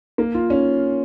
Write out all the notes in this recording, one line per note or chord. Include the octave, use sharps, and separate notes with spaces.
A#3
F4
C#4